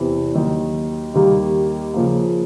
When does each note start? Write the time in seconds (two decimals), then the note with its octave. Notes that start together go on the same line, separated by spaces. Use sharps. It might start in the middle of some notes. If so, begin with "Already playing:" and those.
Already playing: E2 C3 E3
0.34 D#2 D#3 F#3
1.14 D#2 D#3 G3 A#3
1.94 C#3 F3 A#3